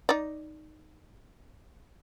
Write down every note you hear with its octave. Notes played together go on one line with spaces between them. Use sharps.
D#4 D5